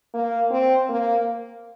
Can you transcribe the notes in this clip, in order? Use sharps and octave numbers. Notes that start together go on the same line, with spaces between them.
A#3
C4
A#3